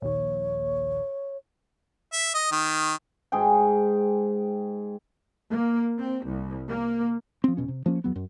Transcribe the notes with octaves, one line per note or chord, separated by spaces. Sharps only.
A#1 D#2 C#5
E5
D#5
D#3
G#2 G#4 G5
A#3
C4
C2
A#3
F3 C4
E1 B2 C#4
C3
F3 A#3 C#4
E2 F#3 B3
F#2